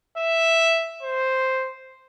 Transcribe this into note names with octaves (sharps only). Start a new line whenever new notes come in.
E5
C5